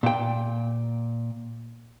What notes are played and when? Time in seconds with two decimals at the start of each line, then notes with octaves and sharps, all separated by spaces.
0.03 A#2 G5